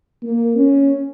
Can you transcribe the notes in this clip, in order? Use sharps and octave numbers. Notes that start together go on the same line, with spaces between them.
A#3
C#4